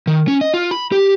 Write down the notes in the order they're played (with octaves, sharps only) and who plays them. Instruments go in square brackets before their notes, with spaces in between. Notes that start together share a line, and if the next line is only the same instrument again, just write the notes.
[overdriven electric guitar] D#3
C#4
D#5
F4
B5
G4